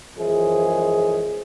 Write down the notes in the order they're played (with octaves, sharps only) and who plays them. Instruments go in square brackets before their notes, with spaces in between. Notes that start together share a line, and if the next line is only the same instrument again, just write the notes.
[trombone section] F#2 E3 F3 G#3 E4 G#4